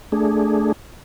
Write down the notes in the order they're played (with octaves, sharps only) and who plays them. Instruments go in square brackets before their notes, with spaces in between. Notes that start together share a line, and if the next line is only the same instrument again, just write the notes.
[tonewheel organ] A3 D4 G#4